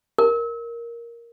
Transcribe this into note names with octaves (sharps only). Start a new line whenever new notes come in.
A#4